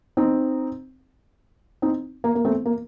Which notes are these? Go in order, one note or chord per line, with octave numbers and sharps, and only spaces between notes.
C4 D#4
C4 D#4
A#3
A#3
A3 C4
A#3